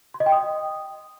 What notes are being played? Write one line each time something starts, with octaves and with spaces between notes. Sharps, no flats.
C6
D#5
G5
D#6